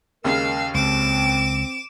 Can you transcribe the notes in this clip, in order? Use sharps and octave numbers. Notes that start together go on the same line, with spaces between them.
D#2 C#3 G#3 A#4 F5 E6
C#2 C4 D6 E7